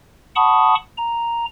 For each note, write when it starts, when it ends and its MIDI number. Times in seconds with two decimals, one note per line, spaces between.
0.36 0.75 78
0.36 0.75 81
0.36 0.75 83
0.36 0.75 85
0.36 0.75 87
0.97 1.46 82